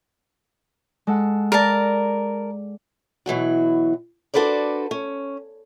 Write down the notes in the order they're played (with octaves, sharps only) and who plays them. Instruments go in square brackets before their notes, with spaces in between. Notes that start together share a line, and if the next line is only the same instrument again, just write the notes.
[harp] G#3 A4 F#5
[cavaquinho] A#4 A5 [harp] D5
[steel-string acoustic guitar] B2 E3 F#3 F#4
D4 F#4 A4 B4 C5 D5
C#4